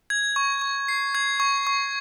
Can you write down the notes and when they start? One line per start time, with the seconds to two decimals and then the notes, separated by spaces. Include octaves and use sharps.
0.10 G#6
0.36 C#6
0.62 C#6
0.88 C7
1.15 G#6
1.40 C#6
1.67 C#6